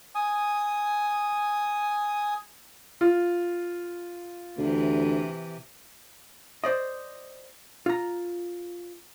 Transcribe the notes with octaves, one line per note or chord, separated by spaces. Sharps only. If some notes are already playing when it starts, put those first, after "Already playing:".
G#5 D#6
F4
D2 C3 E3
C5 D5 D#5
F4 A#5